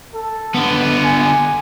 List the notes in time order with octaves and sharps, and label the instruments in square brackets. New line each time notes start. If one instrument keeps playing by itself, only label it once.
[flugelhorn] A4
[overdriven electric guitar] D3 B3
[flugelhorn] G#5